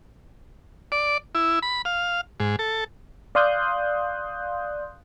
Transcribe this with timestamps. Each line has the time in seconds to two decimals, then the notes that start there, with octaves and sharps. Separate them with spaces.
0.92 D5
1.35 E4
1.62 B5
1.85 F5
2.40 G#2
2.59 A4
3.35 D5 F5 C6 D#6 F#6 G6